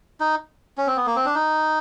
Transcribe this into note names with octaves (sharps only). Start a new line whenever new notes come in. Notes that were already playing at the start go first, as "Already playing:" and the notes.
D#4
C#4
C4
B3
A#3
C4
D4
D#4